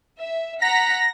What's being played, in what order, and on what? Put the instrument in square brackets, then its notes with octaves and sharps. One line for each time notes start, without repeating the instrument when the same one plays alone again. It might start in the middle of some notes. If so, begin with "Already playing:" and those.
[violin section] E5
[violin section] F#5 A#5 B6 [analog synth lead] A#6